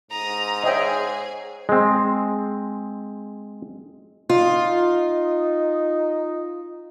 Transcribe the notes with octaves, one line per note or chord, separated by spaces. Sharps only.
G#2 A#5 D#6
G#4 C5 C#5 D#5 E5 G5 G#5
G#3 C4
D#4 F4